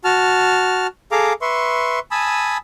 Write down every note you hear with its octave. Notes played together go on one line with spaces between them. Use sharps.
F#4 A5 F6
G#4 A4 F5 A#5 D6
B4 E5 C6 C#6
G#5 A5 B5 D#6 E6